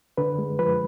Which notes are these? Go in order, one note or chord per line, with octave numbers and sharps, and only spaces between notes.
D3 B4
G#3
F3 B4